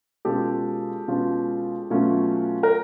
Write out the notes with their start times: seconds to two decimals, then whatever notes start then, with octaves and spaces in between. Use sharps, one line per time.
0.25 B2 G#3 C#4 F4 G4 A4
1.08 B2 G#3 C#4 F4
1.90 B2 F#3 A3 C#4 F4
2.63 A#4